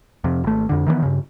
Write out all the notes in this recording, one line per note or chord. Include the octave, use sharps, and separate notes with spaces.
F2 C3
G#1 A3
F2 D3
D#3 E3 G#3 B3
G2 C#3